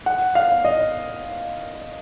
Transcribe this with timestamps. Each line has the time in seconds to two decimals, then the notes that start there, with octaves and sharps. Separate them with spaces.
0.06 F#5
0.35 F5
0.65 D#5